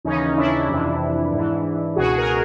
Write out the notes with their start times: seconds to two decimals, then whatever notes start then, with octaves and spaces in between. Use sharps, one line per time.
0.04 D#2 C#3 E3 C#4 D#4
0.36 D4 E4
0.68 F2 C3 E3
1.32 G#2 E3
1.96 C#2 B2 F#4 G#4
2.18 G#4 A#4